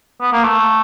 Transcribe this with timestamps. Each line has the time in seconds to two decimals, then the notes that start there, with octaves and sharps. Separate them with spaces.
0.21 B3
0.33 A#3
0.45 A3